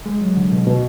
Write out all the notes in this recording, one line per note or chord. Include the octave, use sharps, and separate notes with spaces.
G#3
F#3
D3
B2
B2